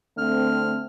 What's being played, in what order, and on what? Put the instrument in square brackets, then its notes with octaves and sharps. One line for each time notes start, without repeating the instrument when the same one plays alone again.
[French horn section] D3 A3 C4 [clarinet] F6